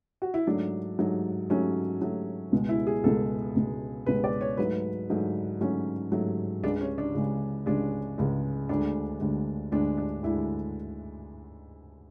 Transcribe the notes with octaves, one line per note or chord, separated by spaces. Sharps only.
F#4
E4
G#2 F#3 A3 D4
G#2 F#3 A3
G#2 F#3 A3 C#4
G#2 F#3 A3
C#2 B2 G#3
E4
G#4
C#2 B2 G#3 A4
C#2 B2 G#3
C#2 B2 G#3 B4
D5
C#5
G#2 F#3 A3 B4
G#2 F#3 A3
G#2 F#3 A3 C#4
G#2 F#3 A3
C#2 C#3 G#3 D4
C#4
D4
C#2 C#3 G#3
C#2 C#3 G#3 D4
C#2 C#3 G#3
D2 D3 G#3 D4
D2 D3 G#3
D2 D3 G#3 D4
D4
D2 D3 G#3 E4